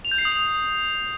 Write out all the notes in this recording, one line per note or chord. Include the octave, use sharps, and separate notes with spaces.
F7
G6
C7
D#6
F7